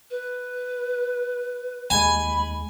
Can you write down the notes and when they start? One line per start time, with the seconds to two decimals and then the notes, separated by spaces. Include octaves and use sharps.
0.11 B4
1.90 D#2 G#3 G#5 B5